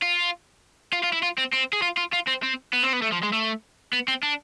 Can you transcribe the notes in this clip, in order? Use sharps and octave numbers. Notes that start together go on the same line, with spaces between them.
F4
F4
F4
E4
F4
C4
C4
G#4
F4
F4
F4
C4
C4
B3
C4
B3
A3
F3
G#3
A3
B3
C4
D4